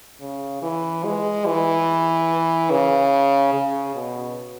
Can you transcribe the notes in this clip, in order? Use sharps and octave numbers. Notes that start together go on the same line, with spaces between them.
C#3
E3
G#3
E3
C#3
C#3
B2